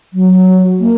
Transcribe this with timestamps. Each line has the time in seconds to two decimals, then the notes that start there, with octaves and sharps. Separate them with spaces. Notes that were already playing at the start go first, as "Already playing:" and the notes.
0.13 F#3
0.80 A#3